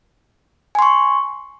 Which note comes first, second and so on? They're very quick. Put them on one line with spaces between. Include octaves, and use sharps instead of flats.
G#5 C6 C#6